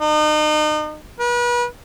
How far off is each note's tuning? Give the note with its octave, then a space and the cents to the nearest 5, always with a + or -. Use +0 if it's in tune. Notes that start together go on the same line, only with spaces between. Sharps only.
D#4 -35
B4 -35